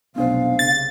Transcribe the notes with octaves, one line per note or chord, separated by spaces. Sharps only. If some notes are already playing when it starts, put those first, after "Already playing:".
F1 B1 B3 D4 C5 F5
C2 C#3 A6